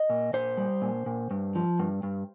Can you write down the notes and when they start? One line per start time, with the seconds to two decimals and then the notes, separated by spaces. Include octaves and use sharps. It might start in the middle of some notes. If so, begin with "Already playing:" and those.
Already playing: D#5
0.10 A#2
0.33 A#2 C5
0.57 G3
0.82 A#2
1.06 A#2
1.31 G2
1.55 F3
1.79 G2
2.03 G2